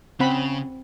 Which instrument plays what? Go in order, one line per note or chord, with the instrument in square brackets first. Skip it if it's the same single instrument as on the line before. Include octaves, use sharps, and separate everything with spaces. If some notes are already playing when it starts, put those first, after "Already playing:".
[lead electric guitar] C#3 [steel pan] C4 F#5 B5